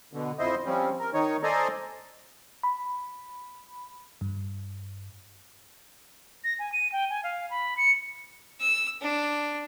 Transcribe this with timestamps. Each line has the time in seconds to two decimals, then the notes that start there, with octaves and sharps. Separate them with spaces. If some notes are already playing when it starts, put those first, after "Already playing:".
0.13 B2 D3
0.39 F2 E4 C5 D#5
0.66 F3 G3 C4 C#4
1.00 A#4
1.14 D#3 D#4 C#5
1.43 A4 C5 D5 D#5 G#5 A#5
2.63 B5
4.21 G2
6.44 A#6
6.59 G#5
6.72 D#7
6.92 G5
7.10 G#5
7.24 F5
7.50 B5
7.77 C#7
8.60 E6
9.01 D4